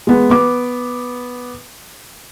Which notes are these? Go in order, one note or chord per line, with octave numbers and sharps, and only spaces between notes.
G#3 B3
B3 D6